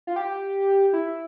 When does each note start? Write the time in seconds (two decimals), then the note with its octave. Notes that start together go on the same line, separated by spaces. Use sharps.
0.07 F4
0.16 G4
0.93 E4